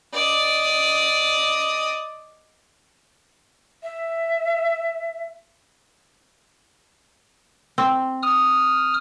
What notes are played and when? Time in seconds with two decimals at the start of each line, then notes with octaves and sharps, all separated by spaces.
0.13 D5 D#5
3.83 E5
7.78 C4
8.23 D#6 F6